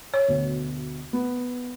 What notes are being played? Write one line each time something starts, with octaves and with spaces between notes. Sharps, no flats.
C#5
D2 B2
B3